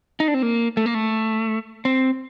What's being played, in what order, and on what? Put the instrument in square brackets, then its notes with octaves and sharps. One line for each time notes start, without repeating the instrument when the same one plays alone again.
[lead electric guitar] D#4
D4
C4
A#3
A3
A#3
A3
C4